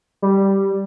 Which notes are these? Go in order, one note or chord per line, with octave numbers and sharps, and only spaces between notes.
G3